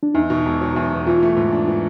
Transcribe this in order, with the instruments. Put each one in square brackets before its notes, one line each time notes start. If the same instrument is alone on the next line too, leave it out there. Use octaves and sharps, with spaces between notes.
[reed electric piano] D4
[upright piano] E2 [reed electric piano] D#4
[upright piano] B2
E1
F#3
E2
B2
[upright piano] E3 [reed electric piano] F4
[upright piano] A3
G#2
D4
E3